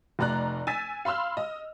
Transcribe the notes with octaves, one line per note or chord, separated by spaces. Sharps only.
F1 A3 D5 A#5 F#6
G#5 E6 A6 B6
F5 B5 C6 E6 F6
D#5